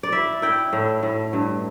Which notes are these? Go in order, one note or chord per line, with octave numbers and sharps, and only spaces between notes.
D5
E4 E5
E4 G5
A2
A2
G2